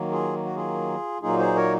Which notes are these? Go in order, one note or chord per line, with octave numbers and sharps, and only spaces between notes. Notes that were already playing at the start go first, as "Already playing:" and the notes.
Already playing: D#3 F#3 A#3
F4 G#4
F#4
F4 G#4
A#2 F#3 A#3 D#4 F4 G#4
G#4 C5
A#4 C#5